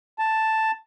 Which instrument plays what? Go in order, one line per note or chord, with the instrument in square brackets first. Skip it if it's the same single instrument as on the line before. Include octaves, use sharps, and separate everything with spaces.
[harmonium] A5